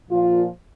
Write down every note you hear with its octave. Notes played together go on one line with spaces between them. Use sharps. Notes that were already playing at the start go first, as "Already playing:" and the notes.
A#2 F3 F4